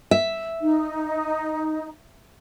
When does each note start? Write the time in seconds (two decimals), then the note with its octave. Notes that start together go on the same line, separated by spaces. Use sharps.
0.11 E5
0.61 D#4